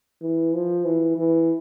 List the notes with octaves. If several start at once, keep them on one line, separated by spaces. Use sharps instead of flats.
E3
F3
E3
E3